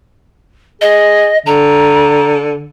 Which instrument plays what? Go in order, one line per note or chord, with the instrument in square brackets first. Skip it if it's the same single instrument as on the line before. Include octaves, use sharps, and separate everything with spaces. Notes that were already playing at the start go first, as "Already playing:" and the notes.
[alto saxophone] G#4 [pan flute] D#5
[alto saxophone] D3 [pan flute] A#5